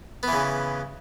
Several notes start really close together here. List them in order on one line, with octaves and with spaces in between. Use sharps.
B3 E3 C#3